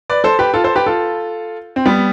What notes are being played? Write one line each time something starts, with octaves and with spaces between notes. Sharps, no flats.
B4 D5
A4 C5
G4 B4
F4 A4
A4 C5
G4 B4
F4 A4
C4
G3 B3